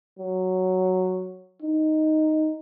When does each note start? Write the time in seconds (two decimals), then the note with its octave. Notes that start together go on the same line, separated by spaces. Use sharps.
0.19 F#3
1.62 D#4